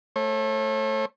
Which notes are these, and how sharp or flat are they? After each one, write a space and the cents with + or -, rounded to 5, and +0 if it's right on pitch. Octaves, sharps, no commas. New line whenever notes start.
A3 +0 C#5 -40